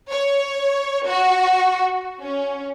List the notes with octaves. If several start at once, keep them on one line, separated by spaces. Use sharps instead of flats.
C#5
F#4
C#4